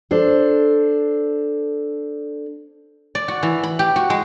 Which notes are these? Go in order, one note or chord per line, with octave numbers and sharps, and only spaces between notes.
D4 A4 C5
D5
F#4
E3
B5
G4
F#4
G#3